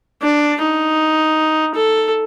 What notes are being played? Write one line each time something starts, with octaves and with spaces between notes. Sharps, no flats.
D4
D#4
A4